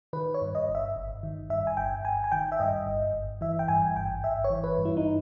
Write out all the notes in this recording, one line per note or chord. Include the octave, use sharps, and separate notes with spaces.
D#3 B4
C#5
G2
D#5
G1
E5
G1
D#3
G2 E5
G#5
G1 G5
G1 G#5
G#5
D#3 G5
E5
G2 D#5
G1
G1
E3 E5
G5
G2 G#5
G#1 G5
G#1 E5
C#5
E3
B4
G2
E4
D#4